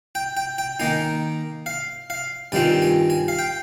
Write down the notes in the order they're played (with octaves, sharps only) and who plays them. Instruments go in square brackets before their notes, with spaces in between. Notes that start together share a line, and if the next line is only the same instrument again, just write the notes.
[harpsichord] G5
G5
G5
D#3 A#3 D#4 G#5
F5
F5
G2 D#3 G3 C4 F4 G#5
G#5
G#5
F5
G5